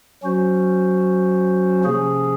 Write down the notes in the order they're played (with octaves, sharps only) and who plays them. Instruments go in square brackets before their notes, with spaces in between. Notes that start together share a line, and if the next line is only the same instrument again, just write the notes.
[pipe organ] F#3 C#4 F#4 C5
C3 F3 A#3 C#4 G#4